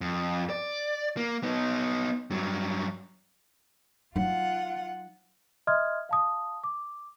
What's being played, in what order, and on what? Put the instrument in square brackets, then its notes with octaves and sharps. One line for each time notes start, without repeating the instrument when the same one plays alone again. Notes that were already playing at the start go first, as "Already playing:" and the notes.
[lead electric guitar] F2
D5
A#3
B3 D#4
G2 F#3
[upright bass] F#3 D#4 [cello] F4 F#5
[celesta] D#5 E5 C6 D#6 F6 G#6
F5 A5 D#6
D6